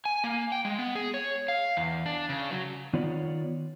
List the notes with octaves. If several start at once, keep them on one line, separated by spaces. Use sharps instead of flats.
G#5
A#3
G5
G#3
B3
G#4
C#5
F5
E2
D4
C#3
F#3
D#3 B3 F4 C#5 D5